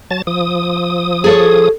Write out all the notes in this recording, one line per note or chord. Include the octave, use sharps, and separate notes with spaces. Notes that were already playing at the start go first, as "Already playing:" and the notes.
F#3 A5 A6
F3 D#6
G#4 A4 C#5